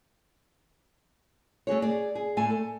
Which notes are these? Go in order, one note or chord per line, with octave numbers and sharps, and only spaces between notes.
A3 F#4 G#4 C#5
G#4 D5
G#4
A2 A3 G#5
A4